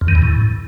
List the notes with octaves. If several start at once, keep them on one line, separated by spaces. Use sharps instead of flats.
F2
D#3
E2
A2